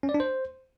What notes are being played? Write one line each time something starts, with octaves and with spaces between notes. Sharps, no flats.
C#4
D5
D4
C5